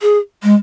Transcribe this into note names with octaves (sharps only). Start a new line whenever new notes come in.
G#4
G#3